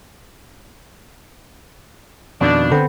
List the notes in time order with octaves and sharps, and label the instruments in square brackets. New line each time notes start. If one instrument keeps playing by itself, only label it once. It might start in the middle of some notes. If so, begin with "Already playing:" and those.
[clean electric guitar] F2 B2 D#3 [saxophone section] D4
[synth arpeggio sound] D3 A4 B5 [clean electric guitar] B3 C4